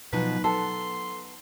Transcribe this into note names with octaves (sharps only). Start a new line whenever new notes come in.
B2 F3 F#3 D#4 B4 A#5
B3 A4 C6